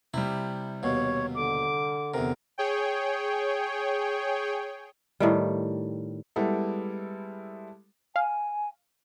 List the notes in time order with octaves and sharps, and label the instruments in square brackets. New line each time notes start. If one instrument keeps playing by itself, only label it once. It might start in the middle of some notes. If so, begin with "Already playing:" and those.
[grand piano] C3 G3 [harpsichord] E4
[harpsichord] D#2 B2 [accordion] C#5
[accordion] D3 [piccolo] D6
[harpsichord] E2 C3 [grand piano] A#4
[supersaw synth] G#4 C#5 G5
[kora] A2 D#3 G3
[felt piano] G3 G#3 B3 E4 A4
[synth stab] F5 [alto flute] G#5